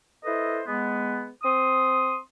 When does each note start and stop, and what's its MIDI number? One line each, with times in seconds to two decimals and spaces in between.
0.24 0.61 64
0.24 0.61 69
0.24 0.61 71
0.24 0.61 72
0.24 0.61 75
0.66 1.27 56
0.66 1.27 59
1.43 2.17 60
1.43 2.17 84
1.43 2.17 87